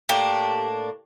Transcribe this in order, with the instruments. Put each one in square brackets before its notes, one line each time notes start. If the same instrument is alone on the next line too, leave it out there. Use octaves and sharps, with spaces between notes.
[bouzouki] A2 A#3 D4 [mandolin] G4